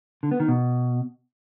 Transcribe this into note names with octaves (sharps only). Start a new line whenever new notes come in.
D3
B3
D#3
B2